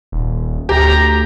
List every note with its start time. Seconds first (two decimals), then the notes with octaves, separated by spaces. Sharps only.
0.12 D#1
0.69 D2 G4 A#5